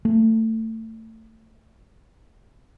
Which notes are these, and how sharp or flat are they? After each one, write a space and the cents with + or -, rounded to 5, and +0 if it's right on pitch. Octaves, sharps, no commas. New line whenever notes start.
A3 +25